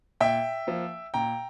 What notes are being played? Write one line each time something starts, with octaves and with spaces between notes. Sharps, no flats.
A#2 E5 G5
F3 A#3
A#2 G5 A#5